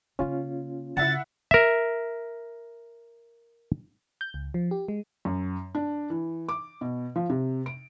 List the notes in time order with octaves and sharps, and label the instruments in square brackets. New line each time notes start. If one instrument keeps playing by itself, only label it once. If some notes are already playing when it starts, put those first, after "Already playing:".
[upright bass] C#3 A#3 [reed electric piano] C#4 F4
[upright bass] C#3 [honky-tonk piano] E4 E5 F#5 [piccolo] A6
[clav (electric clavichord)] A#4 E5
[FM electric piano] G6
C#2
F3
G4
G#3
[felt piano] F#2
D4
E3
D6
B2
F3
C3
D7